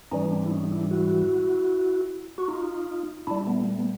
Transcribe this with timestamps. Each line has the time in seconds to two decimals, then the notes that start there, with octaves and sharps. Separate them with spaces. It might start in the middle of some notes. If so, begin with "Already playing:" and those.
0.11 G#2 E3 G3 C#4 D#4
0.31 C4 D4
0.46 E4
0.51 C#4 D#4
0.71 D4 E4
0.91 E4 F#4
2.38 F#4
2.48 D#4 F4
3.27 A#2 G3 D4 E4
3.47 A3 B3
3.67 A3
3.78 B3